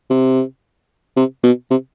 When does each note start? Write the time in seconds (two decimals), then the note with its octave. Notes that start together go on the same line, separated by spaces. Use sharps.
0.11 C3
1.17 C3
1.44 B2
1.71 C3